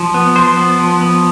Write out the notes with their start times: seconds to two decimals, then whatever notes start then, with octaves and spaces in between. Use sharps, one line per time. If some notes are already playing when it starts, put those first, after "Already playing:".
Already playing: F3
0.14 B3
0.36 F3 C5
0.57 B3
0.79 F3
1.01 B3